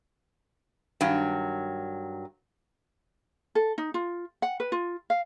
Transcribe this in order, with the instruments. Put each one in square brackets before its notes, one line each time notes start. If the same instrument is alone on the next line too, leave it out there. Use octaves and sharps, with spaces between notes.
[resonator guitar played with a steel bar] G2 D#3 F#3
[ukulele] A4
D#4
F4
F#5
B4
F4
F5